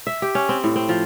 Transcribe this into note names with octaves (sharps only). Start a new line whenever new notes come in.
E5
G4
C#4
C4
A2
C4
F3